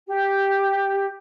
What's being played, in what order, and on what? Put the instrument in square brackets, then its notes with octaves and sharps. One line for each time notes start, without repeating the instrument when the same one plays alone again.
[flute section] G4